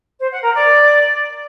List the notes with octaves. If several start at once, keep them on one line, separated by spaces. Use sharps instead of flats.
C5
F#5
A#4
D5